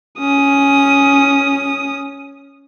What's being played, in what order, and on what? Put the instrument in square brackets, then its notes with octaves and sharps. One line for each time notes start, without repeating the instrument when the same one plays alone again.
[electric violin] C#4 D#6